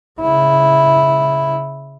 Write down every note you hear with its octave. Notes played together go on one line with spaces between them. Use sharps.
C#3 E4